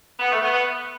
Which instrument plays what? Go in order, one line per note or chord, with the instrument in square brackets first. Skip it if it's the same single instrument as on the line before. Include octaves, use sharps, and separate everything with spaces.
[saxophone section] B3
A3
B3